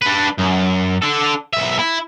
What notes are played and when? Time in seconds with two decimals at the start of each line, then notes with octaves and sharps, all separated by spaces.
0.02 D4 B4
0.38 F#2
1.02 D4 A4
1.53 B1 E5
1.79 E4